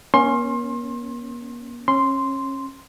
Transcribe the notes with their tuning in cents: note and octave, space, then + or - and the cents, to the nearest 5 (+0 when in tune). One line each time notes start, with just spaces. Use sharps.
A#3 +40 C#4 +0 C6 +30
C#4 -30 C6 -5